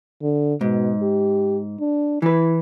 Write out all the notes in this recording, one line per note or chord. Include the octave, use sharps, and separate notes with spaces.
D3
G#2 B2
G4
D4
E3 E4 B4